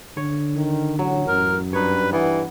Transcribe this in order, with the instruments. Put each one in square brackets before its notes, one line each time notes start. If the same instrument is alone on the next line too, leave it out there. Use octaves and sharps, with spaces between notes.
[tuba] D3 [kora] C#5
[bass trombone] D#3
[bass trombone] A1 [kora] F#3
[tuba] F#2 [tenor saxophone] A#4
[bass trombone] G2 [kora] D#4 C#5 [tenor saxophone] B4
[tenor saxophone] E3 [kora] B3